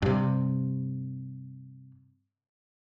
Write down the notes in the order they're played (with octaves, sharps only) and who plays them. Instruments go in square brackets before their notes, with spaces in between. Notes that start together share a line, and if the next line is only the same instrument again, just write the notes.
[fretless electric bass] G2 C3